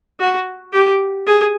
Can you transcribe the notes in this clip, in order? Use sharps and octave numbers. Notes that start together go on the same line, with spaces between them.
F#4
G4
G#4